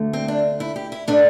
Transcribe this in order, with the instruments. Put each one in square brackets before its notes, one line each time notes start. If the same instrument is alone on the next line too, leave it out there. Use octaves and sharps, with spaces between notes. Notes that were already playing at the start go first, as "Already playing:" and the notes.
Already playing: [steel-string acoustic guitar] D2 D3 A3
C4
D4
E4
G4
E4
A2 A3 D4